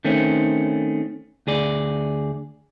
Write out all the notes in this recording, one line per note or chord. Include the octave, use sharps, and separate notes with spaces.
D#3 A3 C4 C#4
D2 G#4 D5